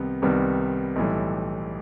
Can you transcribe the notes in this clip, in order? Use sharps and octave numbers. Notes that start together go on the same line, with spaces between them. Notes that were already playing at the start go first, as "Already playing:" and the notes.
Already playing: C2 C3 D#3 G3 B3
C2 C3 D#3 G3 B3
B1 A2 E3 G3